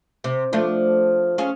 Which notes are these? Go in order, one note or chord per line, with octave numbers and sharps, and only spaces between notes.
C3
F3 A3 D4
C#4 F4 G#4